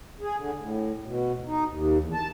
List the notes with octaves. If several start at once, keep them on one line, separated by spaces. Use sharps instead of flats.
G#4
D3
A2
B2
D2
D#4
D#2
E2
A5